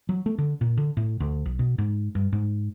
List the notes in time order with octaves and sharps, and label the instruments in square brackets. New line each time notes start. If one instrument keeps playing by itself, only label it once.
[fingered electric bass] F#3
A3
D3
A#2
D3
A2
D2
B1
B2
G#2
G2
G#2